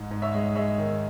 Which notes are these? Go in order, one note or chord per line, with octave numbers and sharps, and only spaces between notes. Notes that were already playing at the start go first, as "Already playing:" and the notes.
Already playing: G#2
G#2
C#5 E5
G#3
G#3 C#5 E5
D#3